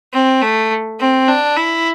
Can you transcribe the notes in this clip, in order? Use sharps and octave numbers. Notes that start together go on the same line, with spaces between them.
C4
A3
C4
D4
E4